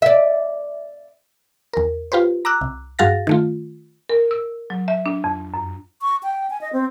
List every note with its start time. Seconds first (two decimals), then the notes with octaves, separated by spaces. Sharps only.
0.02 D5 E5
1.73 E2 A#4
2.12 F4 G4 B4 C5
2.45 A#5 D6 E6 F#6
2.61 C2
2.99 G2 F#4 G#4 F5 A6 A#6
3.27 D#3 A3 F4
4.09 A#4
4.31 E6
4.70 F#3
4.88 E5
5.06 D4
5.24 F2
5.54 F#2
6.02 C#6
6.23 G5
6.50 G#5
6.61 D#5
6.73 C4